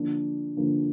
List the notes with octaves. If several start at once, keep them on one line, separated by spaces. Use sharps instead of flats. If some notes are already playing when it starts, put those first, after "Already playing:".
Already playing: D3 F3 A#3 D4
D3 F3 A#3 D4